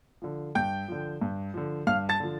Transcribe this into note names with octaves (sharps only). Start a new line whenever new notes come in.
D3 F3
G2 G5 G6
D3 F3
G2
D3 F3
G2 F5 F6
A5 A6
D3 F3